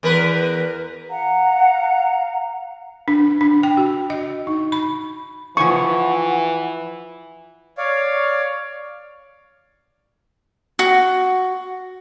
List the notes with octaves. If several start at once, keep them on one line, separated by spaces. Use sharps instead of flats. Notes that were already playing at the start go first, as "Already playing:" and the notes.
E2 A#4 B4
F5 F#5 A#5
D4
D4
G5
F#4
D#5
D#4
B5
E3 F3 G#4 F#5 C#6
C#5 D5 F5
F#4